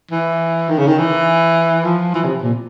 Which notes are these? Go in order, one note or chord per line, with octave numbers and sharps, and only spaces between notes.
E3
D#3
C#3
D#3
E3
F3
E3
C3
A#2